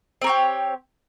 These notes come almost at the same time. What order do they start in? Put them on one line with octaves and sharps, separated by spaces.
C4 A#4 C#5 G4